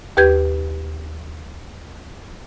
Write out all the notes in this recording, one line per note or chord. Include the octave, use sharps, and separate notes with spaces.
D#2 G4 B4 G6 G#6